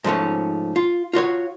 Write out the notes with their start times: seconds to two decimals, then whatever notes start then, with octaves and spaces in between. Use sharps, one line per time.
0.04 G#2 F3 A3 C#4
0.76 F4
1.13 F4 F#4 C5 C#5